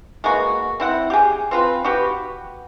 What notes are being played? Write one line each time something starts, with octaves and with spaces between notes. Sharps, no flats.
G#3 A#3 B3 F#4
C4 E4 F#5
G4 G#4
C4 F4 B4
F#4 G4 B4